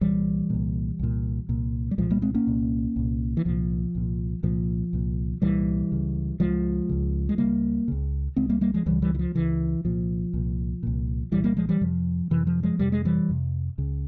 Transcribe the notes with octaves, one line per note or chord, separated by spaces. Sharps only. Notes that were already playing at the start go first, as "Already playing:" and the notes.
C2 A#2 E3 G3
C2 A#2
C2 A#2
C2 A#2
G3
C2 A#2 F3 G#3
G3 A#3
G#3 C4
A#3 C#4
C2 A#2
C2 A#2
E3
C2 A#2 F3
C2 A#2
C2 A#2 F3
C2 A#2
C2 A#2 E3 G3
C#2 C#3
C#2 C#3 F3 G#3
C#2 C#3
G#3
C#2 C#3 G3 A#3
C#2 C#3
C#2 C#3 G#3 C4
G3 A#3
G3 A#3
F3 G#3
C#2 C#3 E3 G3
E3 G3
E3
F3
C#2 C#3 E3
C2 A#2 F3
C2 A#2
C2 A#2
C2 A#2 E3 G3
G3 A#3
F3 G#3
E3 G3
F2 C3 F3
F2 C3 E3
F3
F3 G#3
F2 C3 G3
G#3
E3 G3
F2 C3
C#2 C#3